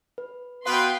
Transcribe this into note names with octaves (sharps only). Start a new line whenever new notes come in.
B4
B2 B4 F5 G5 C6